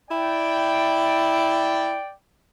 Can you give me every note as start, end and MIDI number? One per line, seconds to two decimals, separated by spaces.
0.11 1.97 64
0.11 2.14 74
0.11 2.14 79